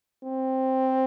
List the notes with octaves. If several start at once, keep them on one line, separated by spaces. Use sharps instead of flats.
C4